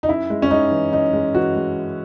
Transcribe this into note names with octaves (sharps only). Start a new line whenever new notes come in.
D#4
F#2 E4
G#3
C#4
G#3 D#4
E3
F#2 D#4
G#3
E3 F#4
G#3